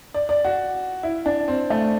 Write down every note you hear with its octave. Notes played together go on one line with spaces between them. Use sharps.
D5
D5
F#4
E4
D4
C4
A3